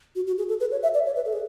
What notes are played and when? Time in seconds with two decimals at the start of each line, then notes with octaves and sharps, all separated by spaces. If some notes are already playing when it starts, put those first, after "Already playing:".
0.16 F#4
0.27 F#4
0.38 G#4
0.49 A4
0.60 B4
0.71 C#5
0.83 E5
0.94 D5
1.06 C#5
1.16 B4
1.25 A4
1.33 G#4